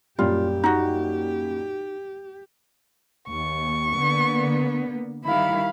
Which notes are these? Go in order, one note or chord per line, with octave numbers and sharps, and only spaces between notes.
F#2 A#2 G3 F4 G4
D#4 F#4
D#2 C#6
D3 A#3 B3
D#3 G3 E4 F5 B5